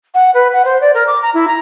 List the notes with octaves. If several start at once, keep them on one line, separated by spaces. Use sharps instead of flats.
F#5
B4
F#5
C5
D5
A#4
D6
A#5
E4
A#5